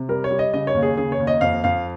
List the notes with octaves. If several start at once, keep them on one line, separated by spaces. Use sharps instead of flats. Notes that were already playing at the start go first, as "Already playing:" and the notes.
Already playing: C3
G3 A#4
C#5
G3
D#5
C#3 D#5
C#5
D#2
G#4
C#3 G#4
C#5
D#2
D#5
F2 F5
F2 F5